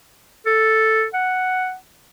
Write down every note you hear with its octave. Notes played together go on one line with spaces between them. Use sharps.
A4
F#5